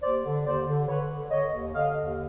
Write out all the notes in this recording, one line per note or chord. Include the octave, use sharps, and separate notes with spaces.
D#2 C5 D5
D3
D#2 C5 D5
D3
D3 B4 C#5
D3
D3 C#5 D#5
D#2
D3 D#5 F5
D#2